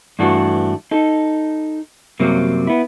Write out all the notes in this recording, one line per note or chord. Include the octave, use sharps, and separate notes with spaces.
G2 E3 A3 D4 F#4
D#4 A4
F#2 C3 F#3 G3 A#3
B3 E4